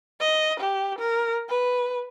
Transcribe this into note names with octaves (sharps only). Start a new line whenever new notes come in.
D#5
G4
A#4
B4